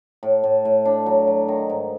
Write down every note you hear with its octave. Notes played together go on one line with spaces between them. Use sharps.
A2
A2
A2
D4
F#3
F#3
D#3
G#2